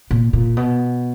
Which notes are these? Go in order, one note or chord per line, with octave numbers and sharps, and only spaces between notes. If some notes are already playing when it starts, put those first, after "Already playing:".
A#2
A#2
B2